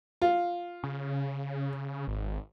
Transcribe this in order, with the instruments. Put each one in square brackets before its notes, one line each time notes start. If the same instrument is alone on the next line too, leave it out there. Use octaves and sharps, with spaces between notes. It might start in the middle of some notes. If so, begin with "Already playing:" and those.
[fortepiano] F4
[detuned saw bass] C#3
G#1